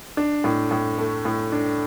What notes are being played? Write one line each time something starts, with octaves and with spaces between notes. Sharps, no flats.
D4
A2
A2
A3
A2
D4